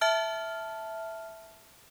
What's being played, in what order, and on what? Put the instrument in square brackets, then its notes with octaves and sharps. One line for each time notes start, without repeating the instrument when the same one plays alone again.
[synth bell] E5 A5 F6